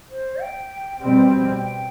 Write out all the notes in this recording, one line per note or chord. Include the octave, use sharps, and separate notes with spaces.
C5
G5
B2 G3 C4 G5
G5